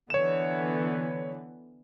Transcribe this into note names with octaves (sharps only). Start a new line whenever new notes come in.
D3 E3 B3 C#5 E7